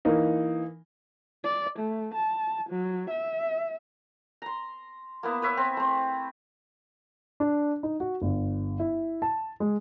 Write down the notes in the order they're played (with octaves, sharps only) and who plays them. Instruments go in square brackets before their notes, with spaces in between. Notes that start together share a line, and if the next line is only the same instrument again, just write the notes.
[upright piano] E3 A#3 D#4
[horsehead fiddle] D5
A3
A5
F#3
E5
[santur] A#5 C6
A#3 B3 E4
B4 C#5 E5
C4
A3 C4
[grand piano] D4
D#4
F#4
G1
E4
A5
G#3